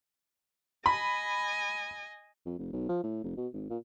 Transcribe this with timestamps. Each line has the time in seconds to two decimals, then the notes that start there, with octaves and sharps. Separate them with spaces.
0.86 D#5 G#5 B5
2.46 F2
2.59 F1
2.73 B1
2.89 F3
3.04 A2
3.23 F1
3.37 B2
3.54 G#1
3.70 A#2